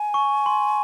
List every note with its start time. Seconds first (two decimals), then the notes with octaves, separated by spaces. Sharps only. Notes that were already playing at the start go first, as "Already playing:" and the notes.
Already playing: G#5
0.14 C#6
0.46 C6